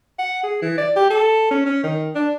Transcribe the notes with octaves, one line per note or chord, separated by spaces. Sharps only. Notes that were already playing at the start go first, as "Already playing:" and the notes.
F#5
G#4
E3
D5
G4
A4
C#4
C#4
D#3
D4